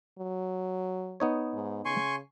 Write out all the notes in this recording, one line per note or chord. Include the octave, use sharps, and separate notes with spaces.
F#3
B3 D#4 C#5
G#2
C#3 G#5 C6 C#6